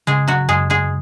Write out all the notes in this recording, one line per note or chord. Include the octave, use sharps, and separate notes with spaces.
C#3 G#3 G#4
F#3 F#4
F#2 G#3 G#4
G#3 G#4